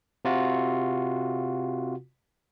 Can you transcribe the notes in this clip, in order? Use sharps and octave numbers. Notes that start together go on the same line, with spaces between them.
C3 F4 F#4